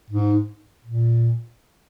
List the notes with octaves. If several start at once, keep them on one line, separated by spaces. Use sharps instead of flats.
G#2
A#2